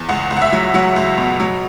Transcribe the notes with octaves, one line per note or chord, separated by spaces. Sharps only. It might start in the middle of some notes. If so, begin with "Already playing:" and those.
Already playing: E2
C#2 F#5
C#2
F#5
E5
F#3
F#3 F#5
C#2
B2
F#3